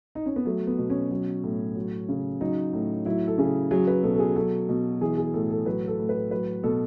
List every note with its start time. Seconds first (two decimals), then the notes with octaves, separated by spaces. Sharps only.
0.15 D#4
0.26 C#4
0.36 B3
0.45 F#3 A3
0.67 B3
0.78 B2
0.90 C#4
1.11 F#3
1.43 A2
1.76 F#3
2.09 C#3
2.41 F#3 D#4
2.73 A2
3.06 F#3 E4
3.27 A4
3.38 C#3 G#4
3.71 F#3 G#4
3.87 B4
4.03 B2 A4
4.15 A4
4.19 G#4
4.36 F#3 A4
4.69 B2
5.01 E3 G#4
5.18 G#4
5.34 A2 A4
5.50 A4
5.66 F#3 B4
5.88 A4
5.99 A2
6.09 B4
6.31 F#3 B4
6.63 B2 A4